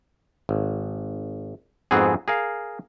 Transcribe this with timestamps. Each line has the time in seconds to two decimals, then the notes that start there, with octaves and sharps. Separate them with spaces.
0.49 G#1
1.91 F2 G#2 B3 C4 F#4 G#4
2.28 G#4 A#4 F5